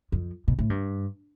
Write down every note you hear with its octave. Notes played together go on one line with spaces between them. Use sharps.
F2
B2
A2
G2